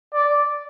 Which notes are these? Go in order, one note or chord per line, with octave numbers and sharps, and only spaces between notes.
D5